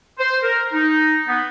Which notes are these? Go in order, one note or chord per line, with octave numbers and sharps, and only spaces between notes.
C5
A#4
D#4
B3